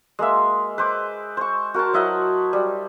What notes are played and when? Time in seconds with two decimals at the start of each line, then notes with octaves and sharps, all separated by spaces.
0.19 G#3 A#3 E5
0.78 B4 C5 D6
1.37 C5 C#6
1.74 F#4 A#4 C5 A5
1.93 F#3 E4 D#5 F#5
2.53 G3